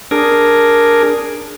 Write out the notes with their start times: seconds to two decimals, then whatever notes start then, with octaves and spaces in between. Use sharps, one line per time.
0.11 D4 G#4 A#4